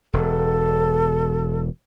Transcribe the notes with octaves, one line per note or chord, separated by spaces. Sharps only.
E1 A4